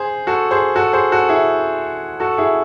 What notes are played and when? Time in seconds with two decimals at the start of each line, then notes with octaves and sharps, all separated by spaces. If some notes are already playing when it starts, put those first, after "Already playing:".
Already playing: G#4 C5
0.27 F#4 A4
0.51 G#4 C5
0.76 F#4 A4
0.93 G#4 C5
1.12 F#4 A4
1.29 E4 G#4
2.20 F#4 A4
2.38 E4 G#4